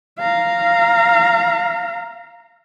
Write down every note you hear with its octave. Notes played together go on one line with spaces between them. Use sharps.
F5 A#5